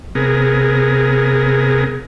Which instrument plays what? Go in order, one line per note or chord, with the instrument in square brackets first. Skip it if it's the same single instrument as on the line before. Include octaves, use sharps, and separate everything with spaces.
[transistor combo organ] C3 B3 G#4 A#4